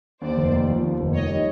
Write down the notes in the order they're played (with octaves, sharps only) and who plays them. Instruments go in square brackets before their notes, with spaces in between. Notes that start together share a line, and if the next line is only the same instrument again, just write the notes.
[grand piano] D#2 [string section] C5 D5
[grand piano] F1
D#2
F3
D#2
F1
[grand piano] D#3 [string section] C#5 D#5
[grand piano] G3